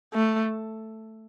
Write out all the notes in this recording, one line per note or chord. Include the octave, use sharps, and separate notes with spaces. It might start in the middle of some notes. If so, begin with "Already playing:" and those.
A3